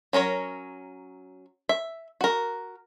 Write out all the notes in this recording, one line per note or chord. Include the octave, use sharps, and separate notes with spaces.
F#3 C#4 A#4 C#5
E5
F#4 A#4